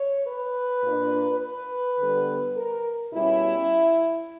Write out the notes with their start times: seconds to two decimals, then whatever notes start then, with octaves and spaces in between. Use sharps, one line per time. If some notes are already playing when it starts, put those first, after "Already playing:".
Already playing: C#5
0.25 B4
0.83 A#2 A#3 D4
1.41 B4
1.98 D3 G3 B3
2.56 A#4
3.13 B2 G3 C#4 E4